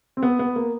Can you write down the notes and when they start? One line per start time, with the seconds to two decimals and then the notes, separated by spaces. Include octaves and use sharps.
0.17 C4
0.23 B3
0.39 B3
0.56 A#3